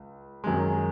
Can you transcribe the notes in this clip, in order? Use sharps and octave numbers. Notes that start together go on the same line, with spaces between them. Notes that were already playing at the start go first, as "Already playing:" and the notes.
Already playing: C#2
F#2 D#3 G#3